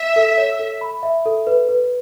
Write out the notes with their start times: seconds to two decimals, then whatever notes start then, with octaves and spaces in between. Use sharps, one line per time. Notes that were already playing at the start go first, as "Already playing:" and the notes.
Already playing: E5
0.16 A4
0.38 C#5
0.60 A4
0.81 B5
1.03 E5
1.26 A4
1.47 B4
1.69 B4